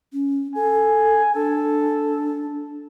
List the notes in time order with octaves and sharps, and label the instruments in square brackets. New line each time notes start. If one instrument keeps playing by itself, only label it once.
[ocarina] C#4
[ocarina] A4 [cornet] G#5
[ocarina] D4 [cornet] A4